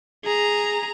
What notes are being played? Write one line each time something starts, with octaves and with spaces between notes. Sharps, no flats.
G#4 A#5